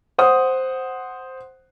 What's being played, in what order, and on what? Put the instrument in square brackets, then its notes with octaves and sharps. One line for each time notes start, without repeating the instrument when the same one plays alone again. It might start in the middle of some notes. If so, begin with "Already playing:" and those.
[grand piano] C5 F#5 D#6